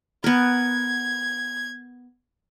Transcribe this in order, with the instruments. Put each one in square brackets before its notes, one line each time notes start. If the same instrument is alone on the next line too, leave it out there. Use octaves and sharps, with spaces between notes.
[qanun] B3 A#4 [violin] G#6